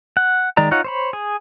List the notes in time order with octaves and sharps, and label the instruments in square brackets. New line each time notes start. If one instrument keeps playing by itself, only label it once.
[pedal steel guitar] F#5
D#3 G#3 D5 A#5
D#4 F4 C#5 F#5
C5 C#5 B5
G#4